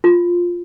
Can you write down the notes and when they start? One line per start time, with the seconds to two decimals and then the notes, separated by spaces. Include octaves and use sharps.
0.04 F4